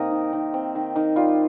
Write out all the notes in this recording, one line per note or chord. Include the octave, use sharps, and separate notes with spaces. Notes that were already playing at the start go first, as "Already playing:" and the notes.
Already playing: C3 A#3 C4 D#4 A#4 D#5
D#3
D#3
C4
D#3
D#3
G3 F4